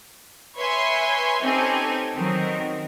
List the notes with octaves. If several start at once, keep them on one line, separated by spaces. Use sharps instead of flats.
B4 C#5 E5 G#5 C6
C4 C#4 D#4 G4 A4 G#5
D#3 F#3 C4 A#4